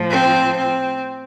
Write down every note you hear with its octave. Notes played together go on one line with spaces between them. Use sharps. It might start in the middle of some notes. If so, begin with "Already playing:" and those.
Already playing: A2 F3
C4
C4